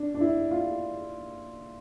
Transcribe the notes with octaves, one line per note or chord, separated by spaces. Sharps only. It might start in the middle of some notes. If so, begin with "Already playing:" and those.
Already playing: D4
D4
E4
F4